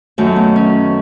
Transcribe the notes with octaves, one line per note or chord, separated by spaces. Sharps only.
F#2 D#3 F#3 A3
B3
C#4